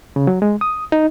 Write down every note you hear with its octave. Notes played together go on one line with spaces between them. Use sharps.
C#3
F#3
G#3
D#6
D#4